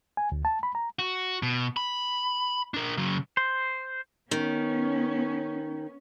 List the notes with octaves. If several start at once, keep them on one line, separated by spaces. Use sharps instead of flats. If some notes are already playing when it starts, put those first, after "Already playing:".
G#5
D2
A5
B5
A#5
F#4
B2
B5
D4 A#4
C#3 F#3
C5
D#3 B3 C#4